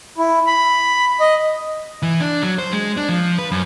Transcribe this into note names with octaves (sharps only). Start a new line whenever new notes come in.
E4
B5
D#5
E3
D4
F#3
C5
G#3
D4
F3
B4
F#2